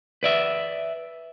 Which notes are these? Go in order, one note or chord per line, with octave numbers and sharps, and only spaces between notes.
B4 D5 E5